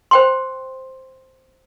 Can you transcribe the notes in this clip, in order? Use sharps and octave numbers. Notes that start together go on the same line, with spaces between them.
C5 G5 C6